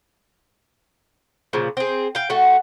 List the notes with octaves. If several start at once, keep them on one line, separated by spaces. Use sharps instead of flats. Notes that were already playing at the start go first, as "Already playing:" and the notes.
A#2 C#3 F3
C4 G#4
F5 G5
A3 F#4